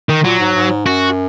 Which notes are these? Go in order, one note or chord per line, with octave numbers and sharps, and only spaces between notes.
D#3
A#2 F#3
G#2
G#2
F#2 F#4